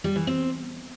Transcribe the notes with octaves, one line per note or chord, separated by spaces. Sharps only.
G3
E3
C4